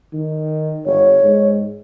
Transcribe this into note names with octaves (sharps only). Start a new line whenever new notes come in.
D#3
G1 C#5
G#2